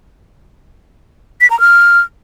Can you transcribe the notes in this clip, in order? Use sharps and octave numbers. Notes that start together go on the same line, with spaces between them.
B6
A#5
F6